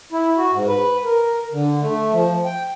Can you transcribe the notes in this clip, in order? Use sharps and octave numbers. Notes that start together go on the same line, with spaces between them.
E4
F#4
G#2
B4
A#4
D3
A3
F3
G5